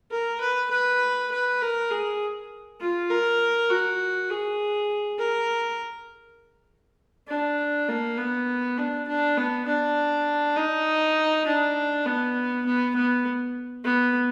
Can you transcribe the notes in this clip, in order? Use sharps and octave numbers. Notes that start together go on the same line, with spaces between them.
A#4
B4
B4
B4
A#4
G#4
F4
A#4
F#4
G#4
A#4
D4
A#3
B3
D4
D4
B3
D4
D#4
D4
B3
B3
B3
B3